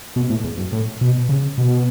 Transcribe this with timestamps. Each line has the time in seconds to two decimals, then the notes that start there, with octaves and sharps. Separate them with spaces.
0.16 B2
0.30 A2
0.44 E2
0.58 F#2
0.72 A2
1.01 B2
1.29 C#3
1.58 B2